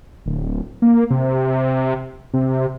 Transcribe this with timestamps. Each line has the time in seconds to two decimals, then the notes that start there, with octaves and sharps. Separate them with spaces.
0.26 D1
0.82 A#3
1.10 C3
2.34 C3